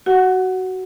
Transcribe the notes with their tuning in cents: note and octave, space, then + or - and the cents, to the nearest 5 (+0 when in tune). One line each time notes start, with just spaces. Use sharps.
F#4 +15 F#5 +0